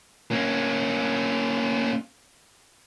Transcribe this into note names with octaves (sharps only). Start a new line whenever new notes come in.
A#3 C#4